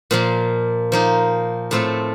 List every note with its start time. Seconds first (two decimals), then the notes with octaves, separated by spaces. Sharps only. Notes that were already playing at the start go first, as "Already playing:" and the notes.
0.11 A#2 F3 A#3
0.92 F3 A#3 D#4
1.71 A2 A3 C4 F4